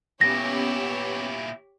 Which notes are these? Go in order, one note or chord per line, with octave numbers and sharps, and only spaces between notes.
A#2 B3 C#4 E4 G4 C#5 A#6